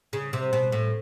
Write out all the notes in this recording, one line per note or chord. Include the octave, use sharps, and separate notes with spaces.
C#3
C3
B2
A2